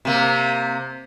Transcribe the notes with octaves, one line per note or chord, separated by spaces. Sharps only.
C3 A#3